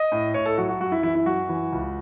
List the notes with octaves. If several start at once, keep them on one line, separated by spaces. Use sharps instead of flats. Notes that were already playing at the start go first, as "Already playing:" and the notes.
Already playing: D#5
A2
A2 C#5
A4
F#3 F#4
F#4
F#2 F#4
E4
E3 E4
E4
F#2 F#4
E3
C#2